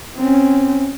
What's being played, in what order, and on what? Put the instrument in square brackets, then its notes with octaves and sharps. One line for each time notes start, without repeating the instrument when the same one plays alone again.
[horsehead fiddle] C4 C#4